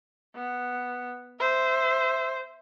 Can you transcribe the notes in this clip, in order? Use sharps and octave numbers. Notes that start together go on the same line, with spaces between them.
B3
C5 E5